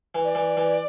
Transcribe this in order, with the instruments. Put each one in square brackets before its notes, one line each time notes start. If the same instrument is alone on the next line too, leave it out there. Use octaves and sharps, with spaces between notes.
[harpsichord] E3
[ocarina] D5
[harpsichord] E3
E3